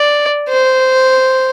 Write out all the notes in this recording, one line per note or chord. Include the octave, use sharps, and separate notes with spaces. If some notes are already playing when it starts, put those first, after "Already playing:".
Already playing: D5
C5